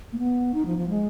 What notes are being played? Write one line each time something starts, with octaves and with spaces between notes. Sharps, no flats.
A#3
B3
D#4
F3
F3
G#3